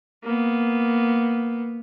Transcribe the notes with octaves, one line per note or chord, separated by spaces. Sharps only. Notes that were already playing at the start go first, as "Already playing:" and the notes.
A#3 B3